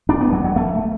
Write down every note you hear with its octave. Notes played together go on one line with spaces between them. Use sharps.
D4
B3
F#3
F#3
A3